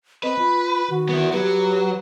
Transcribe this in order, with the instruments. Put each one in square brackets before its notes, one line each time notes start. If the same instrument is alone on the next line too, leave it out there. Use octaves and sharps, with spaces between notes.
[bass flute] C4 [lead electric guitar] B4 [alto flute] D#5
[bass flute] F4 [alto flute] B5
[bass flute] D#3 [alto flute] F#4
[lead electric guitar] B3 E4
[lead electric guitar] F#3 [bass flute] G4 [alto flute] B4